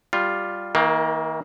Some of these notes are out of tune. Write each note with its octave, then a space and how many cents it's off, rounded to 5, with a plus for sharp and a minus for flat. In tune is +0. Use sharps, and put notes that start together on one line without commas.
G3 +0 F4 +0
D#3 +45 A#3 +5